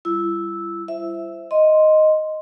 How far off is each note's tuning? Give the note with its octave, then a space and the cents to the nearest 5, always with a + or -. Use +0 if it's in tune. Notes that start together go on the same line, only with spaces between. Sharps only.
G3 +0 E4 +45 E6 -10
C5 -5 E5 +5
D#5 +0 C6 +0